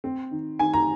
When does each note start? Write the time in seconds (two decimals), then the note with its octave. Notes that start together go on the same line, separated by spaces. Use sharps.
0.04 C4
0.31 D#3
0.59 D#3 G#5
0.74 A#5